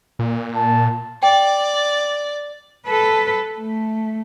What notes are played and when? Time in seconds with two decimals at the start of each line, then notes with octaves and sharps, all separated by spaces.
0.19 A#2
0.56 A5
1.23 D5 G5
2.86 A4 B4
3.58 A3